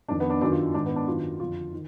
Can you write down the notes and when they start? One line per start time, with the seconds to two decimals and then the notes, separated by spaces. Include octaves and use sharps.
0.08 F2 D#3 D4
0.20 B3
0.30 D4
0.41 F#2 D#3 D4
0.52 F4
0.74 G#2 D#3 D4
0.86 B3
0.96 D4
1.08 F#2 D#3 F4
1.40 F2 D3 F4
1.73 D#3